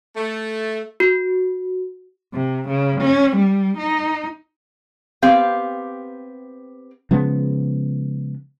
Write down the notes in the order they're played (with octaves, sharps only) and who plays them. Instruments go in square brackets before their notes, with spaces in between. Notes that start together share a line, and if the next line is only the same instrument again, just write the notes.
[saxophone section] A3
[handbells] F#4
[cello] C3
C#3
C#4
G3
D#4
[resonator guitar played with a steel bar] B3 C4 G4 F5
[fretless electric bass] C#3 F3 G#3 B3